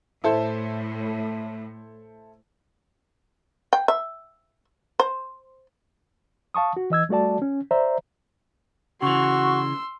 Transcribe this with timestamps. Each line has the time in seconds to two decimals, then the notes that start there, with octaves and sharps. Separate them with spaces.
0.24 A2 E4 A4 C5
3.73 G5
3.88 E5
5.00 C5
6.54 F5 A5 C#6 D#6
6.77 F#4
6.90 E3 D#5 E6 G#6
7.09 G3 A3 F#4 D5 A5
7.42 C#4
7.71 C5 D5 E5 A#5
9.02 C#3 E3 F#4 C6 C#6 E6